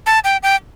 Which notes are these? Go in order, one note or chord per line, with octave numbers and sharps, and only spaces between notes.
A5
G5
G5